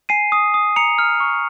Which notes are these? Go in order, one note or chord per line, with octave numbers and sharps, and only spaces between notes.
G#5 C7 D#7
D#6
D#6
A#5 C#7 F7
F6
C#6